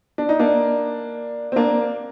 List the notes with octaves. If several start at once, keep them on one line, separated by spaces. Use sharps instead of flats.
D4
D#4
A#3 D4
C4
A#3 D4